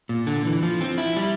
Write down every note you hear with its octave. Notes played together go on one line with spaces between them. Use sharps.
A#2
D3
E3
F3
C4
E4
G3